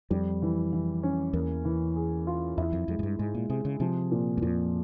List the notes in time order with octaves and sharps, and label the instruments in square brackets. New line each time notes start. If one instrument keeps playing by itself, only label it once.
[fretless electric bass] F2 [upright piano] G3
[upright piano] E3
E3
C#4
[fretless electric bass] E2 [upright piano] A#3
[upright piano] E3
G#4
F4
[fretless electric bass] E2 [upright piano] E4
[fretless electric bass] F2
[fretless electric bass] F2 [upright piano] G#3
[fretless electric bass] G#2
G2
[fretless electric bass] G#2 [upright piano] G#3
[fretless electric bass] A#2
[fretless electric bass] C3 [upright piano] G#4
[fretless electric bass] C#3
[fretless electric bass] C3 [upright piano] F3
[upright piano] A#2
[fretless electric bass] G2
[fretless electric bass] F2 [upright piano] A#2